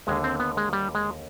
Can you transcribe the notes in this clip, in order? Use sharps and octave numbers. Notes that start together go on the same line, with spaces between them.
D#2 D3 G#3
C4
B3
G#3
G3
G#3